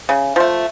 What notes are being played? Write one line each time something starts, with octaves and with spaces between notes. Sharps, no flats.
C#3
F3 A3